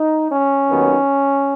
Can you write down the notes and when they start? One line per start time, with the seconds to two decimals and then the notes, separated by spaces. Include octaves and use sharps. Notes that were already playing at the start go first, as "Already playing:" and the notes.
Already playing: D#4
0.30 C#4
0.69 D#2 D#3 F#3 B3